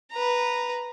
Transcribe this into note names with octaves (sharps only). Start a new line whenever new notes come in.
B4 A#5